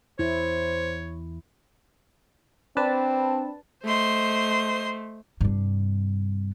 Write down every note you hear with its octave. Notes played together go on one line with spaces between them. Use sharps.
E2 E3 E4 C5 C#5
C4 D4 B4 A5
A3 C5 D#5 C6
G2 C3